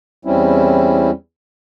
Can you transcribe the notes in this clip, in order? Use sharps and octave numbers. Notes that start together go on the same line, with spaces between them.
E2 G3 C4 C#4 E4